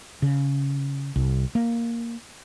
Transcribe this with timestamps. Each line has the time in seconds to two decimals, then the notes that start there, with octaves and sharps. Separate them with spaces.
0.22 C#3
1.16 C2
1.55 A#3